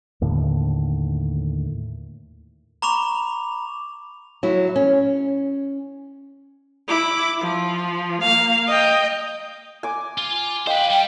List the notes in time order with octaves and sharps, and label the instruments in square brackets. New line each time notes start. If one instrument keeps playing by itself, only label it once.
[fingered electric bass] D#2 A2 D3
[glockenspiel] A#5 B5 C#6 D6 F7
[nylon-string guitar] F#3 E4
C#4
[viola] E4 D6
F3
A#3 F5
D#5 G5
[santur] G#5 D6
[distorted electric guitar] F4
[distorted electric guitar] B4 C5 [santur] D#5 [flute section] F5 G5
[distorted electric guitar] G3